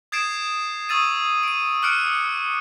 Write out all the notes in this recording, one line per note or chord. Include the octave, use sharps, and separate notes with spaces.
D#6 G#6 A6 C7 D7 E7
C#6 D#6 E6 A6 D#7
D7 D#7
D6 F6 F#6 C#7 D7